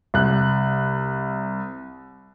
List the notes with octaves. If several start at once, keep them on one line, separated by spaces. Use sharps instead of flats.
C2 F#6